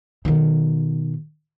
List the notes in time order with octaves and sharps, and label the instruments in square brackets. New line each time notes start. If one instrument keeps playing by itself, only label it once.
[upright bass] B2 D#3